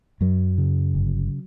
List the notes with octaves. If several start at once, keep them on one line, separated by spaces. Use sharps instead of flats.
F#2 F#3
C#3
G1